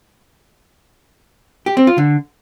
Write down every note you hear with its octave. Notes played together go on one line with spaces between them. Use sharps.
G4
C4
F4
D3